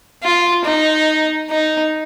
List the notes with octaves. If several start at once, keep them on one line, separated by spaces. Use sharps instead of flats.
F4
D#4
D#4